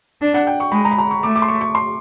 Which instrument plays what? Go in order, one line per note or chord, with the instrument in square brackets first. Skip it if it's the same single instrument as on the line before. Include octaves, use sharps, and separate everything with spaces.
[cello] D4
[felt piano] F#5
G5
C#6
[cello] G#3 [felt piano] B5
[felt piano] A#5
B5
A#5
C#6
[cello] A3 [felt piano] D6
[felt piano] D6
C6
C#6
C#6
C6